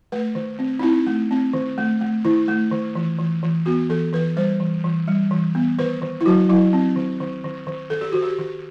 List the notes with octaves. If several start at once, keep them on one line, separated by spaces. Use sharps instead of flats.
A3 B4
D#3
C4
D#4
C4 E4
A3
C4
D#3
A3
A3
D#3 E4
A3
D#3
E3
E3
E3
B3 F#4
E3 A4
E3 B4
G3 C5
E3
E3
G3
E3
B3
D#3 B4
D#3
E4
F#3 F#4
F#3 E4
C4
D#3
D#3
D#3
D#3
D#3 A4
G4
D#3 F#4
G4
D#3